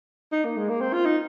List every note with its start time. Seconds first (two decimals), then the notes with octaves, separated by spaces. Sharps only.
0.32 D#4
0.44 A#3
0.57 G#3
0.69 A#3
0.81 C4
0.93 F4
1.05 D#4